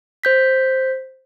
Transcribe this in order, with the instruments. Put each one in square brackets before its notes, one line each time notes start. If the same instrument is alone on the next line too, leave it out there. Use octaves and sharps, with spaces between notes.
[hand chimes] C5 G6 B6